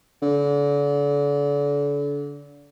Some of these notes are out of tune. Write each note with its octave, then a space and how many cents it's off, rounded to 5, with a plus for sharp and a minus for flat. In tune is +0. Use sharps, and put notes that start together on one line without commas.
D3 -35